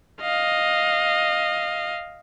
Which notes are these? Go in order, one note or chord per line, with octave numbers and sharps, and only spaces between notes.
D#5 F5